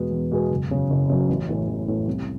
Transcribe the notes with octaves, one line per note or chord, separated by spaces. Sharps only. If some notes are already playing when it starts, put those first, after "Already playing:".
Already playing: E2 B2 G#3 B3
E2
B2 G#3 B3
F#1
F#2 C#3
F#1
F#2 C#3
A1
A2 E3
A1
A2 E3
C2